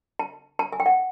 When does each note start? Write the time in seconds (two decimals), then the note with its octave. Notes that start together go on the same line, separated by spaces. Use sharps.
0.19 A5
0.59 A5
0.73 G#5
0.80 G5
0.86 F#5